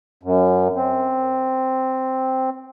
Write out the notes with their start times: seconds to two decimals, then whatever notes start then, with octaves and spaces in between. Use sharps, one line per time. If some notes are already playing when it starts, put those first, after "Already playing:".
0.23 F#2
0.76 C4